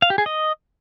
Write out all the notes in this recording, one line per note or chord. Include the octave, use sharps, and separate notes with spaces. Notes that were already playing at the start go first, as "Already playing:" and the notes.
F5
G4
G#4
D#5